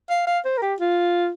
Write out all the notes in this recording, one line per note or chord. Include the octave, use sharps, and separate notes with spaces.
F5
F5
C5
A#4
G4
F4